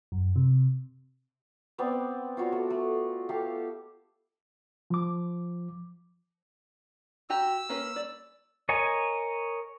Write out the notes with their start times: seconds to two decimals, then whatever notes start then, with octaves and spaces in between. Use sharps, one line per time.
0.12 F#2
0.36 C3
1.78 B3 C4 D5
2.37 F4 F#4 C#5 D5
2.52 A3
2.70 A3
3.29 G4 A4 F5
4.90 F3 D6
7.30 F#4 G4 A#5 E6
7.69 A#3 C#4 B4
7.96 D5
8.69 A#4 C#5 D#5 G#5